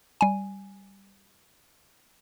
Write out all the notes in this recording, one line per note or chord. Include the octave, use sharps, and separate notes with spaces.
G3 G#5